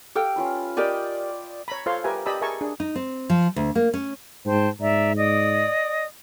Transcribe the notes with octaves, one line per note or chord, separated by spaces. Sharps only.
G4 A4 F5 G5
C#4 F4 B4
G4 A#4 D5 D#5 G5 G#5
C#5 A#5 B5
F4 A4 C5 C#5 F5 C6
G4 A#4 B4 E5 G#5
G4 D5 D#5 A5 B5 E6
G#4 A#4 E5 G#5 A5 C#6
D4 G#4
D#4
C4
F3
D2
A#3
C#4
G#2 C5 G5 A5
G#2 D5 E5 A#5
D5 D#5 D#6